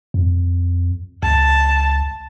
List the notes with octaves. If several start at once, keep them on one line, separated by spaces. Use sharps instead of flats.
F2
C#2 A5